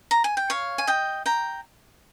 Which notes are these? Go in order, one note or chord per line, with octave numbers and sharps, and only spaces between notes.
A#5
G#5
G5
C#5 F5
G#5
D#5 G5
G5 A#5